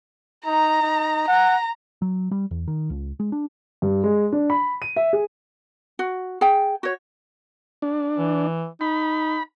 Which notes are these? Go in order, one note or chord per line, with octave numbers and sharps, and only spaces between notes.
D#4 A#5
D#4
F#5 A#5
F#3
G3
E2
D#3
C#2
G#3
D4
G2
G#3
D4
B5
D#7
E5
G#4
F#4
G#4 G5
F#4 C#5
D4
E3
D#4 B5